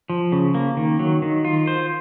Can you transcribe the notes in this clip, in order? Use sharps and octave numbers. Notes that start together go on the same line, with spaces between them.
F3
C#3
A#3
D#3
F#3
D#3
F4
C5